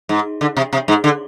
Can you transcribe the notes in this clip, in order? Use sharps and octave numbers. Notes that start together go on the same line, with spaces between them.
G#2
D3
C3
C3
G#2
D3